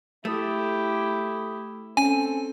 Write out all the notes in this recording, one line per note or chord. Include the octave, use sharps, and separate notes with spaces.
A3 E4 G4 A4 D#6
C4 C#4 A4 G#5